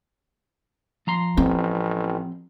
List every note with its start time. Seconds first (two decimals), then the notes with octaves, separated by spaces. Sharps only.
1.07 F3 A#5 C6
1.37 A1 C4